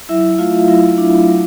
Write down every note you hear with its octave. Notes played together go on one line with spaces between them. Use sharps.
F#3 E4 E5
A3 F4 F5
F#3 E4 E5
D4
F#3